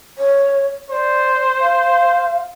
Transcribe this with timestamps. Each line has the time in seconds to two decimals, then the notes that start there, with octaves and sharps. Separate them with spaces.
0.18 C#5
0.90 C5 D5
1.60 F5